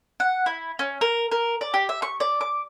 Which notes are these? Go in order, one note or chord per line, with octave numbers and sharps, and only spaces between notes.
F#5
E4
C#4
A#4
A#4
D5
G4
E5
C#6
D5
D6